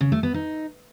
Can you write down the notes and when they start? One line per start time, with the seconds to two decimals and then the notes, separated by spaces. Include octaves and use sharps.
0.01 C#3
0.12 A3
0.23 B3
0.34 D#4